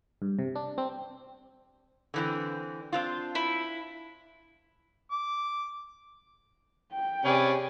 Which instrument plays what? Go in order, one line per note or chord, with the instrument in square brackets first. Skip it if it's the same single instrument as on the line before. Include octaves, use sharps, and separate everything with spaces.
[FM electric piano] G2
C3
D4
C4
[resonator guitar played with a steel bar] D3 E3 C4
C4 D4 F4
[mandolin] E4
[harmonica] D6
[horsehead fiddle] G5
[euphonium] C3 [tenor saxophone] C#4 [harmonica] G#4 B4 D5